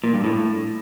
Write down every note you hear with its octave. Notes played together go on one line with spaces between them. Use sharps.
A#2
G2
A2